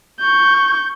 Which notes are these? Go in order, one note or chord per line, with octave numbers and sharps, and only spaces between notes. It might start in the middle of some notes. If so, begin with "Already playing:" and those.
C#6 G6